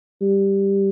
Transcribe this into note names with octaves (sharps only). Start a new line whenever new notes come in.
G3